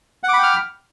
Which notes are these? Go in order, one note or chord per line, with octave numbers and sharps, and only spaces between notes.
F#5 G5 B5 D6 F6